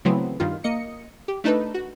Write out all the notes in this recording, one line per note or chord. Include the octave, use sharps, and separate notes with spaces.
C#3 E3 F#3 A3 B3 C4
G2 D#3 F4
A#3 D#5 C#7
G4
A3 D4 D#4 A4 B4
F#4